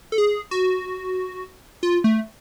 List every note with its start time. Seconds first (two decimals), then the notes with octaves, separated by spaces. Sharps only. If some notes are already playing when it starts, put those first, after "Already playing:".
0.12 A4
0.18 G#4
0.51 F#4
1.83 F4
2.04 A3